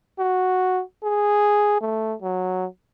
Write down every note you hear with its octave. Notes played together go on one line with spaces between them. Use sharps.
F#4
G#4
A3
F#3